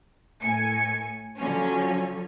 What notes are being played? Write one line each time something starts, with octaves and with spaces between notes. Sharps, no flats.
A2 G#5 C#7
D3 F3 F#3 C#4